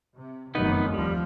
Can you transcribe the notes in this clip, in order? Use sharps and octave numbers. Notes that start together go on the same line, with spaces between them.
C3
F1 F#2 D#3 B3 D#4 B4
D#2 F3 G3